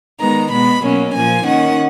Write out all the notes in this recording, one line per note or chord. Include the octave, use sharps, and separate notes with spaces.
D#3 G#3 B3 A#5
B2 G#3 B3 B5
B2 F#3 A#3 C#4
A#2 F3 A#3 G#5
D#3 A#3 C#4 F#5